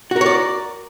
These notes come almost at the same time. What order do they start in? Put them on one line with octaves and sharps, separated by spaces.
F#4 A#4 C#5 D5